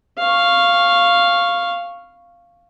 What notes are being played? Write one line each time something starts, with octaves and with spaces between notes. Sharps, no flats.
F5 C#6